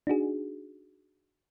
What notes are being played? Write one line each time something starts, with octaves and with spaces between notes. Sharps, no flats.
D4 D#4 F#4 G#4